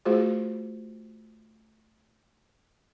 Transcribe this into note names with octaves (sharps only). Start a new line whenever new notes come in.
A3 F4 F#4 G#4 C5